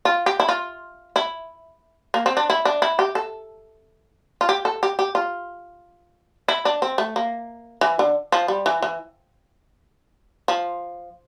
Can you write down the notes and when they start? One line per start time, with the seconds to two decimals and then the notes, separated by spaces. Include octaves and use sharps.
0.05 F4
0.26 G4
0.40 E4
0.49 F4
1.16 E4
2.14 A#3
2.26 C4
2.37 D4
2.50 E4
2.65 D4
2.82 E4
2.99 G4
3.15 A4
4.41 F4
4.49 G4
4.65 A4
4.83 G4
4.99 G4
5.15 F4
6.48 E4
6.65 D4
6.82 C4
6.98 A3
7.16 A#3
7.81 E3
7.99 D3
8.32 F3
8.48 G3
8.66 E3
8.82 E3
10.48 F3